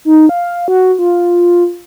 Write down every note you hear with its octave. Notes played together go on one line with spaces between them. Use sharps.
D#4
F5
F#4
F4